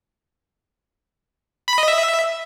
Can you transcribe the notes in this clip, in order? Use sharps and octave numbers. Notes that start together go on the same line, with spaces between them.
B5
D#5
E5